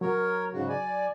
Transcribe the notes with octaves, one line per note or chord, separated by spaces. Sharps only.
F#3 A#4 C#5
G#2 C#3 F#4
D5 G#5